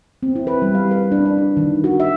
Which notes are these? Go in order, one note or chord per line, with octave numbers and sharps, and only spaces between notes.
C4
E4
B4
G3
F5
B4
D4
D4
D4
D#3
F#4
E5